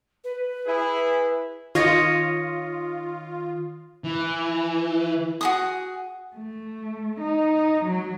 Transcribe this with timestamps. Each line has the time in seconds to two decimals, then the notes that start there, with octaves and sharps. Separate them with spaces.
0.24 B4
0.67 E4 G#4
1.75 D#3 F4 C#5 D#5 C#6 A#6 C#7
4.04 E3
5.41 F#4 G#4 D#6
6.36 A3
7.20 D#4
7.84 F#3